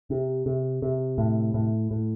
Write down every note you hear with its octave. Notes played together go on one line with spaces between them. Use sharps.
C3
C3
C3
A2
A2
A2